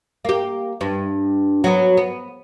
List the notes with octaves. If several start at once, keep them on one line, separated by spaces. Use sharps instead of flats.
A#3 G4
G2
F#3 B3
B3